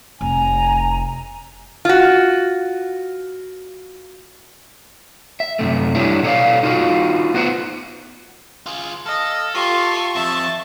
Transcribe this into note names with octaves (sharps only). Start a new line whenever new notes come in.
F1 G#5 A#5
F4 F#4
E5
F#2 C3 A3
G3 D4 E4 G4 C#5 E5
B2 A4 C#5 D5 F5
D#4 F4 F#4 A#4 F5
B3 F4 B4 C5 D#5 F#5
F4 G#4
A4 D#5 F5
F4 G4 C#6
F2 E5 A5